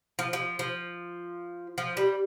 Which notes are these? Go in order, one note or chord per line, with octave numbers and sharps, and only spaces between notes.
F3
F3
F3
F3
G3